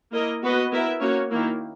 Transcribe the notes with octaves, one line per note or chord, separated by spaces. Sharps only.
A#3 E4 A#4 D#5
B3 F#4 B4 D#5
B3 E4 A#4 E5
A#3 C#4 F#4 C#5
D#3 A#3 E4